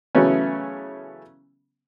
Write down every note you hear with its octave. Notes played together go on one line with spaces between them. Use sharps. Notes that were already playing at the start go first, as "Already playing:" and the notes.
C#3 E3 F#3 A3 B3 C#4